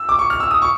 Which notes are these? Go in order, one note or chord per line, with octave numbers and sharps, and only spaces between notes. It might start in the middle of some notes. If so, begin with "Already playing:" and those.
Already playing: E6
D6
C#6
F6
E6
D#6
C#6